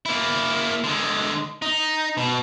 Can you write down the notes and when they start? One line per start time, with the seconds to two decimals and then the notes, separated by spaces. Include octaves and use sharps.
0.06 A#3 E4
0.84 D3 G#3
1.62 D#4
2.17 B2